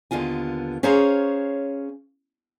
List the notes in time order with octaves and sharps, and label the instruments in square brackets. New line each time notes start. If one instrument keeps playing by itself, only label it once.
[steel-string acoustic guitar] D#2 D3 B3 F4 G#5
C#4 G#4 C5 C#5 F5 A#5